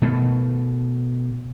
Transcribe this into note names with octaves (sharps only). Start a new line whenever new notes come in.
B2 A3